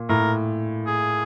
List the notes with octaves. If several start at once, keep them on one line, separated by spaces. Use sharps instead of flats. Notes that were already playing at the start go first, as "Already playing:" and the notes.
Already playing: A#2
A2 A#4
G#4